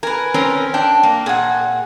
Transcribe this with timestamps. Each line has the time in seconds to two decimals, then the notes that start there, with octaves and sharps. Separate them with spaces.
0.03 A#4 B4 G#5
0.34 C4 C#4 A#4
0.74 D4 G5
1.03 A#3
1.26 A#2 G#4 F#5